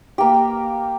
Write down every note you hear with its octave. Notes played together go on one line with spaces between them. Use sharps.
A#3 G4